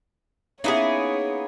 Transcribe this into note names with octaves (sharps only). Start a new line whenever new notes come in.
A#3 B3 C#4 D#4 E4 G#4 C#5